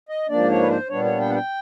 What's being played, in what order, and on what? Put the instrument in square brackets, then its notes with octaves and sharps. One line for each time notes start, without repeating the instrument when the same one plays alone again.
[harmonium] D#5
G#2 F3 A#3 D4 D5
C#5
B4
C5
A#2 G3 B3 D4 C#5
C#5
G5
F#5
G5